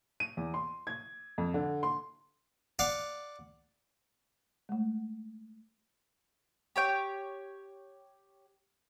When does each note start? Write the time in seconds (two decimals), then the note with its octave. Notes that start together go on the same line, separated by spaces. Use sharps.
0.20 D#7
0.37 E2
0.54 C6
0.87 G#6
1.38 F2
1.54 D3
1.83 C6
2.79 D5 F5 F#5
4.69 G#3 A3
6.76 G4 C#5 G5